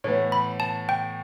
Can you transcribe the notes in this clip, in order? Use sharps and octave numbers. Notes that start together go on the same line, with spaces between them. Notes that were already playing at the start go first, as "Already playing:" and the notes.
A2 E3 B3 C#5
B5
A5
G5